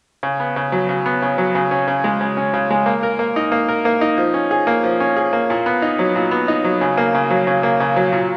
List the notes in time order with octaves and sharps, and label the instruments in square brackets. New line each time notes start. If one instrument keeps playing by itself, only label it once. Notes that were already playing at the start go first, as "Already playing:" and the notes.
[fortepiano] C#3
B3
C#3
F#3
C#3
B3
C#3
F#3
C#3
C#4
C#3
G#3
C#3
C#4
C#3
G#3
A#3
A#4
A#3
D#4
A#3
A#4
A#3
D#4
F3
C#4
G#4
A#3
F3
C#4
G#4
A#3
A#2
B3
D#4
F#3
A#2
B3
D#4
F#3
C#3
A#3
C#3
F#3
C#3
A#3
C#3
F#3
A#2